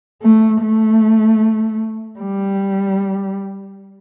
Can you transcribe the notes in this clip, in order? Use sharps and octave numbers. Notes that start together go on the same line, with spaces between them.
A3
A3
G3